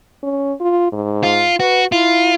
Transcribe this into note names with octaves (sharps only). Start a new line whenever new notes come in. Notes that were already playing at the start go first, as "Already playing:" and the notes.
C#4
F4
G#2
F4
F#4 B4
E4 F4